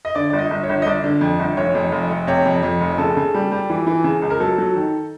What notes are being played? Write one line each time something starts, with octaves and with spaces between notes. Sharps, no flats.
D#5
D3 D5
G1 D5
D#5
G1
C#5
G1
D#5
G1 D5
D3
F2
G1
F1 C#5
F2
F1
F1
C3 C#5
F2
F2
F1
C#3 A4
C#3
G3
G3
E3
E3
C#3
C#2
A#4
F#3 A4
F#3
D#3